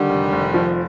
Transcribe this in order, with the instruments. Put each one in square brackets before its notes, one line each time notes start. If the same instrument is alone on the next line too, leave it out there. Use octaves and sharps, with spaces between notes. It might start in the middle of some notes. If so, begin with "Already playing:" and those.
Already playing: [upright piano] D3 [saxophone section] D#3 G3
[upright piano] F1
F1
F3